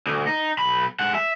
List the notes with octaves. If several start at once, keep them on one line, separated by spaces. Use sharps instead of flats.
D2
D#4
B1 B5
G#3 F#5
E5